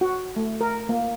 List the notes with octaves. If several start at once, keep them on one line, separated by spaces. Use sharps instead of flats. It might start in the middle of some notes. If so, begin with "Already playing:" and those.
F#4
A3
A#4
A#3